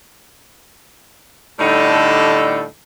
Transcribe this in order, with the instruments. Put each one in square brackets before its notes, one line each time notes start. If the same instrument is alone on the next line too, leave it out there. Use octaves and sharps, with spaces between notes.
[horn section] A2 D3 G3 D#4 A4